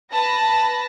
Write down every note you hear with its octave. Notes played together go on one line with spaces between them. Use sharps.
B4 A5 B5 A#6